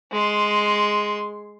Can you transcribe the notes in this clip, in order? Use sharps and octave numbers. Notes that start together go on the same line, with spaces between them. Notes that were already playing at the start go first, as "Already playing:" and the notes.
G#3 C6